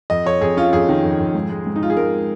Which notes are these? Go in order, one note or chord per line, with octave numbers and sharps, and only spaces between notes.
F2 D#5
F2 C#5
F2 G#4
C#4 F4
F2 G#4
D#3
F2
F2
G#2
G#3
G#2
D#4
G#3 F4
G#4
G#2 A#4